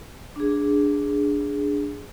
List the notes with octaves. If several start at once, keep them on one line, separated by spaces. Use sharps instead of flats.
D4 G#4